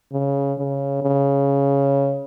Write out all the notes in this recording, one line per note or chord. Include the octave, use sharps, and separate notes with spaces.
C#3
C#3
C#3